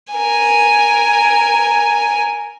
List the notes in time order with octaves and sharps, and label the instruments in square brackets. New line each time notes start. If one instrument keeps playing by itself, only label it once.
[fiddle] A#4 G#5